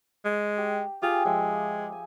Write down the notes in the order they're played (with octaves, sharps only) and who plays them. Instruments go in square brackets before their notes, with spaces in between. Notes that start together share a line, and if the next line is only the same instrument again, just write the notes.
[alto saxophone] G#3
[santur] G4
[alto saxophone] F4 [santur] G4 G#4
[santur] F3 E5 [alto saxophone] G#3
[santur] G#5